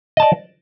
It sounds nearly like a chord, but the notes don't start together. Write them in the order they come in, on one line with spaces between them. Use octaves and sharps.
D#5 A5 D5